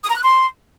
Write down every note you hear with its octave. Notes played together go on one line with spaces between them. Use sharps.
D#6
A#5
F#6
C6